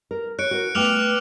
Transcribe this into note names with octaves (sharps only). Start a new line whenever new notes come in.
A#4
C#5 F#6 C#7 D7
F#4 A#4
A3 B3 G5 D6 F6 F7